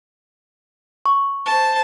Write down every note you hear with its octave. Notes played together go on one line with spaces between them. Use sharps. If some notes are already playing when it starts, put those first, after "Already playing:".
C#6
C5 A5